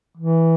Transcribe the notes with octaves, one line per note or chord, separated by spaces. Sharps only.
E3